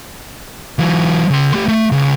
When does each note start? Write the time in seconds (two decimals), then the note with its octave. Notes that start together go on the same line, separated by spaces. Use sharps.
0.79 E3 F#3
1.30 C#3 C6
1.54 A3 G4
1.68 A3
1.92 C#2